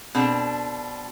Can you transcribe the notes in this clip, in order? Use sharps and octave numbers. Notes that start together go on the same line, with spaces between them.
B2 C4 D4 A4